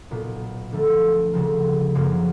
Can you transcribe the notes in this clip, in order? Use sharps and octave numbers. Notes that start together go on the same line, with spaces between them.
B1 A#2 F#3 B3
D2 D3 F3 A3
D2 C#3 F3 A#3
F#2 C#3 F3 A#3